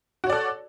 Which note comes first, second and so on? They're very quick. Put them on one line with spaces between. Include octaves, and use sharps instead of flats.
F#4 C#5 D5 A4